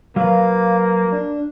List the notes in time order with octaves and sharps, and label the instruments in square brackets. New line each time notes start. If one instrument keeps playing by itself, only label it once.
[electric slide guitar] F#3 B4 [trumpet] A#3 [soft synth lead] F5
[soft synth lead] D4